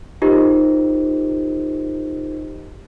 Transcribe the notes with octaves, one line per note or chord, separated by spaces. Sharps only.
D#4 F4 G4 A#4 C5 D#5